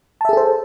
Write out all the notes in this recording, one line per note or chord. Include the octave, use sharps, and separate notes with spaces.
G#4 A4 C5 E5 A5